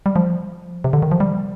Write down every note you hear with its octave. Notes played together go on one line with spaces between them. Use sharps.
G3
F3
C3
D3
D#3
F3
G3